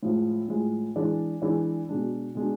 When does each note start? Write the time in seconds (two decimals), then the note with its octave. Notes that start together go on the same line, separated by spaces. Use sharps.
0.03 A2 F3 G#3
0.48 A2 F3 G#3
0.96 E3 G#3 D4 G#4 D5
1.42 E3 G#3 D4 G#4 D5
1.89 B2 G#3 D4
2.35 B2 G#3 D4